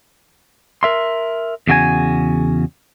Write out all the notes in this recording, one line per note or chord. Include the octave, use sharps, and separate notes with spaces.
A#4 E5 C6
E2 C#3 F#4 G#4 G#5